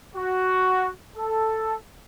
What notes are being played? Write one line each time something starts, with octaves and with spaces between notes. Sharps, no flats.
F#4
A4